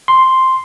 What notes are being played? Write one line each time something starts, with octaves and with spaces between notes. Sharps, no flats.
C6